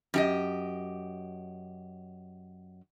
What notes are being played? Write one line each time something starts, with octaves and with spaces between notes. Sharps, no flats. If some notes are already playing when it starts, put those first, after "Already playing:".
F#2 G4 D#5